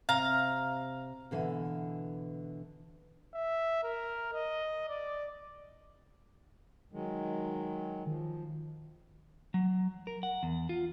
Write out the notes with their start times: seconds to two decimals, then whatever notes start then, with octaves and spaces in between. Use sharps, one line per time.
0.09 C3 F5 A#5
1.31 B2 D3 E3
3.34 E5
3.84 A#4
4.33 D#5
4.89 D5
6.93 D#3 F#3 G#3
8.07 D#3 F3
9.54 F#3
10.07 A#4
10.23 F#5
10.43 E2
10.69 F4